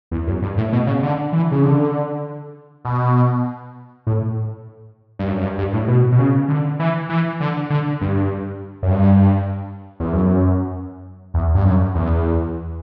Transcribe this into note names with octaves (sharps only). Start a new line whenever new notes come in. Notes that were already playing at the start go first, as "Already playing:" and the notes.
E2
F#2
G2
A2
B2
C#3
D3
E3
C#3
D3
B2
A2
G2
F#2
F#2
G2
G2
A2
B2
B2
C#3
D3
E3
E3
D3
D3
G2
F#2
G2
E2
F#2
E2
G2
F#2
E2